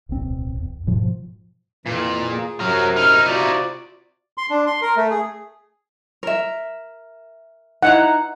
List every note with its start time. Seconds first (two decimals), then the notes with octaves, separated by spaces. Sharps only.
0.09 D1 B1 C4
0.61 E2
0.87 G#2 B2 F3
1.86 F2 A#2 E3
2.30 G#4
2.60 F#2 C3 F#3 A#4
2.96 D#4 E4 F6
3.28 C3 F4 F#4 D5
4.38 C6
4.50 D4
4.67 C6
4.82 A#4
4.97 A3
5.11 G#4
6.23 A#4 E5
7.82 D#4 E4 F#5 A#5